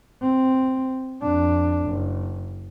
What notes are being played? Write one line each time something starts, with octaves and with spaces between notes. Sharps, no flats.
C4
F2 D4
F#1